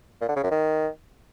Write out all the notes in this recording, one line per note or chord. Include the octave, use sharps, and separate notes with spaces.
A#2
D3
C#3
F#2
D#3